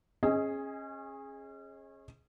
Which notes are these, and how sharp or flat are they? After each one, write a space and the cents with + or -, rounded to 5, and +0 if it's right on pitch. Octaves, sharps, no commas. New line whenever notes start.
C#4 -30 G#4 +0 D#5 +15